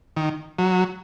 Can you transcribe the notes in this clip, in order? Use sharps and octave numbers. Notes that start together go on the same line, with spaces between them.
D#3
F#3